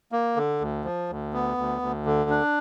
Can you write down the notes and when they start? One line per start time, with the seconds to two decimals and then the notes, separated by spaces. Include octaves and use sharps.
0.12 A#3
0.36 D3
0.61 D2
0.85 F3
1.10 D2
1.33 B3
1.57 D2
1.82 D2
2.06 D3
2.30 D4